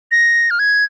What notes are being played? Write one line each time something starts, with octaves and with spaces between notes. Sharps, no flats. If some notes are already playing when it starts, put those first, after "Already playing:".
A#6
F6
G#6